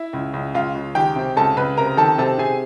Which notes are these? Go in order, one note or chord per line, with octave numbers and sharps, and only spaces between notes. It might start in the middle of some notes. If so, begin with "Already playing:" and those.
Already playing: E4 E5
C#2
C#2
C#2 F4 F5
C#2
D#3 G4 G5
C3
C#2 A4 A5
C#2 B4 B5
C3 A#4 A#5
D#3 A4 A5
C3 A4 A5
C3 G#4 G#5